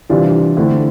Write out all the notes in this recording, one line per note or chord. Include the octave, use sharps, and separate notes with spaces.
C3 E3 G3 D4 F4
D3 A3 C4 E4